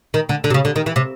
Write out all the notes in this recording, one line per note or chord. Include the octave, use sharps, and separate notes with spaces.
D#3
D3
D3
C3
C#3
D3
D#3
E3
C3